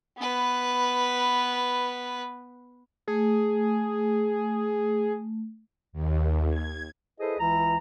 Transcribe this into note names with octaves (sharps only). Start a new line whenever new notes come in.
B3 B4
A3 G#4
D#2
G#6
E4 G#4 A4 B4 C5 D#5
C#2 E3 E4 A#5